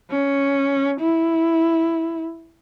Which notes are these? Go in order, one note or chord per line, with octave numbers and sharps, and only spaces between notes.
C#4
E4